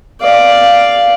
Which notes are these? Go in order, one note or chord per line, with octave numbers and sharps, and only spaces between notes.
D5 F5